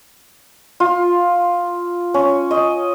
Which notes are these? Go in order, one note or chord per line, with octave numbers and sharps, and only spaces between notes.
F4
C#4
D#5